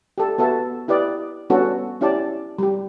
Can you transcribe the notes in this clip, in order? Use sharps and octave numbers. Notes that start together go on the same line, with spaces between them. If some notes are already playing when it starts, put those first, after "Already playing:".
G4 A4
B3 F#4 A4 E5 A5
E4 G4 B4 D5 D#5
G3 B3 C#4 D4 F#4 A4
C#4 E4 G4 D5 A5
G3 G4